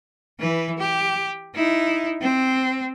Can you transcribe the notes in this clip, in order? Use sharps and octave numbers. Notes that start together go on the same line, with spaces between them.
E3 B4
G4
D#4 E4
C4